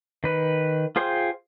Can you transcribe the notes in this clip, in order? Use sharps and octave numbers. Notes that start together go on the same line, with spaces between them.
D#3 B4
F4 G#4 C5 G5 C6